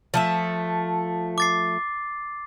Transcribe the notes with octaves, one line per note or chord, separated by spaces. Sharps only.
F3 A3 E5
D6 A6 C7